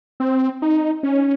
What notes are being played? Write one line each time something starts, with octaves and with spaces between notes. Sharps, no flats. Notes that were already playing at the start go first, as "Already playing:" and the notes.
C4
D#4
C#4